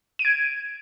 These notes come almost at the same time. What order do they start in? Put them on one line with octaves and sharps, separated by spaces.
D#7 D7 G#6